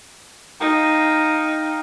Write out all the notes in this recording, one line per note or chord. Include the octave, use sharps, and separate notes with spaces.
D#4 F5 G5 A#5